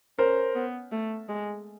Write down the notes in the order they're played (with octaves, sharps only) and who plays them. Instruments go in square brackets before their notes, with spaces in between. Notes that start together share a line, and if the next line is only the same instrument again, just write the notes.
[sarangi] C#4 [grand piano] A#4 C5
[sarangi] B3
A3
G#3